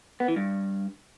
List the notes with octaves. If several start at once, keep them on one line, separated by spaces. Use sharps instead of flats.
B3
E3
G2